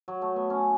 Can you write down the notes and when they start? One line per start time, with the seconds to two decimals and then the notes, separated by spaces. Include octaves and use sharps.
0.08 F#3
0.22 A3
0.36 B3
0.50 C#4